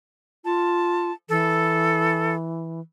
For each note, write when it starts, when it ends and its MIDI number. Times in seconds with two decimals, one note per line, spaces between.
0.45 1.11 65
0.45 1.13 81
1.29 2.80 52
1.29 2.35 69